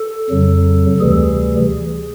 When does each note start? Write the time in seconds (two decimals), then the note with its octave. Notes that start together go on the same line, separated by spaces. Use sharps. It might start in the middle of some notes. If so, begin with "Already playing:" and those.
Already playing: A4
0.30 F2 C#3 F#3
1.00 D2 C3 E3 G3 G#4